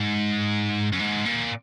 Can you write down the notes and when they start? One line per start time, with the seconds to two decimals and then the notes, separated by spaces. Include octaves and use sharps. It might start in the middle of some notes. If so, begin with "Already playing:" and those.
Already playing: G#2
0.93 F#2
1.00 G#2
1.25 A#2